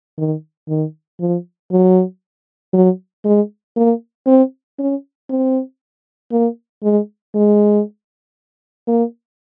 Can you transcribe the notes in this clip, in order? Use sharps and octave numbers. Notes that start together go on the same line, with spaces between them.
D#3
D#3
F3
F#3
F#3
G#3
A#3
C4
C#4
C4
A#3
G#3
G#3
A#3